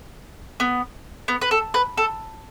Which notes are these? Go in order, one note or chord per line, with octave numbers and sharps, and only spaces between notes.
B3
B3
B4
A4
B4
A4